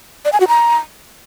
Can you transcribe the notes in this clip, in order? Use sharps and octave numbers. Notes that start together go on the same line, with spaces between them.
D5
G#5
F#4
A#5